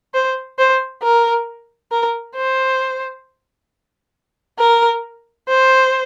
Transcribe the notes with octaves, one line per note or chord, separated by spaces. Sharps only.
C5
C5
A#4
A#4
C5
A#4
C5